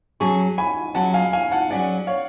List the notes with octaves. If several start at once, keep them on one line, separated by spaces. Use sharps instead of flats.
F#3 C#4 G#4 A5 C#6
G#5 B5
F#3 C#4 G#4 F#5 A5
F5 G#5
F5 G#5
F#5 A5
F#3 C#4 G#4 D5 F#5
C#5 F5